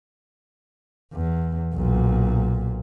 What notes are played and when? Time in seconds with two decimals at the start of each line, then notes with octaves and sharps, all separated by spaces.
1.14 E2
1.74 B1 A#2